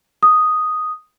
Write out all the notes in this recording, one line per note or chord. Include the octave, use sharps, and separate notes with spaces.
D#6